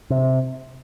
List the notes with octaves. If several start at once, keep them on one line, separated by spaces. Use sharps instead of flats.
C3